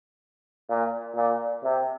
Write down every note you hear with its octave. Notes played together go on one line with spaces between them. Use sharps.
A#2
A#2
C3